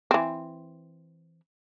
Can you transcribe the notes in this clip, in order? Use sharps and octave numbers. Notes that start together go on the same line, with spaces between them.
E3 C4